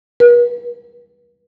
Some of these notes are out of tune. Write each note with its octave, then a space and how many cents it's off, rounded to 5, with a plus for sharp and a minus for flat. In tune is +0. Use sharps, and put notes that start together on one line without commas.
B4 -40